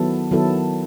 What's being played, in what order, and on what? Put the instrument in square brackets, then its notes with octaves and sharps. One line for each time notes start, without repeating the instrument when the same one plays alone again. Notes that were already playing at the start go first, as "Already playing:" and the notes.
Already playing: [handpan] D#3 F#3 B3 E4 A4
D#3 F#3 B3 E4 A4